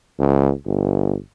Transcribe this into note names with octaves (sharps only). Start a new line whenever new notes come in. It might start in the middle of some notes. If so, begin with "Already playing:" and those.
C#2
G1